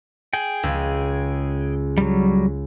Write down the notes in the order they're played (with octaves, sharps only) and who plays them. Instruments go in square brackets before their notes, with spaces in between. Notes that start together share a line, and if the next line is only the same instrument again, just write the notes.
[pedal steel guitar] G#4 G5
[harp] C#2
[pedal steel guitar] F#3 G3